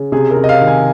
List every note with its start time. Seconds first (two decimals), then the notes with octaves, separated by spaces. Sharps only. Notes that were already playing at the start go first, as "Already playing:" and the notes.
Already playing: C#3
0.12 C3 G#4
0.31 A#4
0.37 C3
0.44 D#5
0.49 F5
0.61 D#3
0.67 G#5